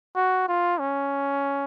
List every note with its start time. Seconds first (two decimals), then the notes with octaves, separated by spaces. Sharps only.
0.16 F#4
0.49 F4
0.80 C#4